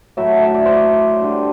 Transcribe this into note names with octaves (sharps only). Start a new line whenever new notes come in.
A2 F#3 A3 E4 E5
E5
D5
C5
D5
D3 G3 D4